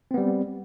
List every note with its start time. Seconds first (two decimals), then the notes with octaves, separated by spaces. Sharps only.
0.11 C4
0.14 B3
0.18 G3